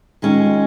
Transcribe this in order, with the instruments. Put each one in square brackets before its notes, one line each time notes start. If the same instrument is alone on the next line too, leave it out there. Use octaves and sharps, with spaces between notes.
[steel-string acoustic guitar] D#2 D#3 G#3 C#4 F4